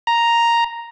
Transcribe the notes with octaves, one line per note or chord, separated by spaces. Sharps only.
A#5